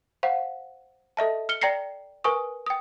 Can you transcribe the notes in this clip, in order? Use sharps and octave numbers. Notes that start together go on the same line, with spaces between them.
C5 F5 F#5
A4 D#5 E5 A5
F6 C#7 G7
D5 G5 A#5 A#6 C7 C#7
A#4 B4 G#5 C#6 D#6
G5 D#6